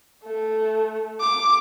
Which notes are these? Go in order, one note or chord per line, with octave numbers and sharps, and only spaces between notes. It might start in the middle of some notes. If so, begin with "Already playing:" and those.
A3
D6